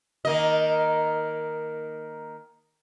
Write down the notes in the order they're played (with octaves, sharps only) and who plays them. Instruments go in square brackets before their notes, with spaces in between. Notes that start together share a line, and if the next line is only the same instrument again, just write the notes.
[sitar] D#3 A#3 D#5